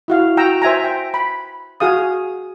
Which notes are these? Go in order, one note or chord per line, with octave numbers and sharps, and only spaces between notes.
E4 F#4 F5
F#4 G5 A#5 E6
C5 E5 G#5 A#5
G5
B5
F#4 G#4 F5 D#6